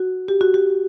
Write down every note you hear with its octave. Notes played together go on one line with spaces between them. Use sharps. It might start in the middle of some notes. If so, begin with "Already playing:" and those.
Already playing: F#4
G4
F#4
G4